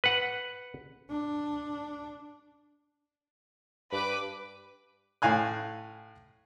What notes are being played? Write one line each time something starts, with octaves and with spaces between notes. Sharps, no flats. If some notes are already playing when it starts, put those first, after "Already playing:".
B4 F#5
D4
G2 B4 D6
A2 F5 G#5 F#6